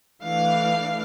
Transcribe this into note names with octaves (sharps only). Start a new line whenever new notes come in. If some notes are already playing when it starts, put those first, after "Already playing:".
E3 A3 D4 F5